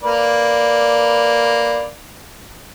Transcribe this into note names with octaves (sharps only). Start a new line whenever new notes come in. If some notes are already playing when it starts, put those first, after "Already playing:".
A#3 B4 D5